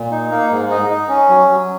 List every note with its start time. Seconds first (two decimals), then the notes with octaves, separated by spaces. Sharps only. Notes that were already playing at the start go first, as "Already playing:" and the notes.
Already playing: A#2
0.11 D#4
0.31 A#3
0.51 G#2
0.70 D#4
0.90 D#4
1.09 C#4
1.29 F#3
1.49 F#3